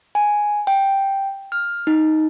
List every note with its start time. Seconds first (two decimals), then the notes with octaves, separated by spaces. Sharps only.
0.15 G#5
0.67 G5
1.52 F6
1.87 D#4